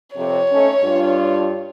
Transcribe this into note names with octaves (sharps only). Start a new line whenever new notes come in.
F2 C3 C#5
A3 C#4 D#4
G2 D4 F4